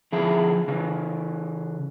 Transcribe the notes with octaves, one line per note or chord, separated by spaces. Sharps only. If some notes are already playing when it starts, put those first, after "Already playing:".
D3 F3 E4 G#4
C#3 E3